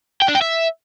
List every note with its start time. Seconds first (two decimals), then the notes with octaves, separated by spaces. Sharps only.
0.22 G5
0.28 D4
0.35 G5
0.41 E5